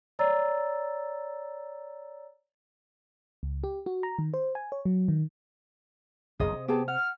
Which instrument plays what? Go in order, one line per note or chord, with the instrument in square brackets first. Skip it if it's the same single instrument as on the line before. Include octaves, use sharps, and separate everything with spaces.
[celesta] C#5 D5 A#5 E6 A6
[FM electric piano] C#2
G4
F#4
A#5
D#3
C5
G#5
C#5
F#3
D#3
[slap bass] F#1 B1 F2 [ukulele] G#4 D#5
[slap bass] C3
[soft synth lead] B3 [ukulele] G4 G#4 A5
[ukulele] F#5 [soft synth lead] F6